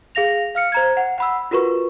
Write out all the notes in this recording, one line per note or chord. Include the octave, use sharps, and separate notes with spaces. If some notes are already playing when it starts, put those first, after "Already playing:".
G#4 F5 A#6 F7
F5 F6 C#7
C5 A#5 G#6
F#5
F#5 B5 E6
F4 F#4 A#4 B4 C#6